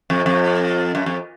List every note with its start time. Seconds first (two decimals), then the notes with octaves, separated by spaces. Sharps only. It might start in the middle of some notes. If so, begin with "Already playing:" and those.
0.10 F2
0.26 F2
0.95 F#2
1.06 F2